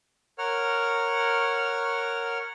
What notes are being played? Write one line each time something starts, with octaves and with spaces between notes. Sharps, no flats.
A#4 C#5 F#5 F6